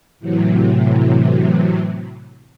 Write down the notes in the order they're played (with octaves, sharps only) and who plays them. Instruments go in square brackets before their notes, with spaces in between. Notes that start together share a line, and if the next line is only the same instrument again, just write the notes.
[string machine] A2 C3 E3 F#3